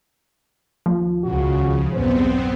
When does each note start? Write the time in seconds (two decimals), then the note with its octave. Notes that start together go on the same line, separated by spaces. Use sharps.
0.86 D#2 F3
1.23 C#2 C#3 F#4
1.93 B1 E2 G2 B3 C4 C5